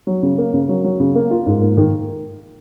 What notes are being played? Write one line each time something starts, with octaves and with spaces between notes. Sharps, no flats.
F#3
C#3
A#3
C#3
F#3
F#3
C#3
A#3
F4
G#2
A#3
D#3